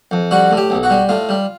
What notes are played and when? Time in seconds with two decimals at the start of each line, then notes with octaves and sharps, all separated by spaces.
0.11 F2
0.31 G3 F#4
0.51 A2
0.57 G4
0.70 B1
0.83 F#4
0.90 G3
1.09 A2 F4
1.29 G3